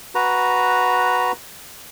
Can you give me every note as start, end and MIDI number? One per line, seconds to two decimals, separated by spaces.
0.15 1.32 66
0.15 1.32 71
0.15 1.32 82